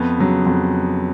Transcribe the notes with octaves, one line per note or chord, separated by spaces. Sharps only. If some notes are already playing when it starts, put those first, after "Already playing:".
Already playing: F2 B3 B4
C#3 F#3
F2